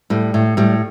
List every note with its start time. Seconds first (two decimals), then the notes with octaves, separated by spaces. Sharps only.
0.10 A2 G3
0.34 A2
0.57 A2 G3